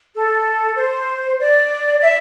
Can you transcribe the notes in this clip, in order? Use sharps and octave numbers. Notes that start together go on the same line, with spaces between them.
A4
C5
D5
E5